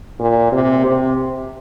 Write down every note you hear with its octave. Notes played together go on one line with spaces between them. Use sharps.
A#2
C3
C3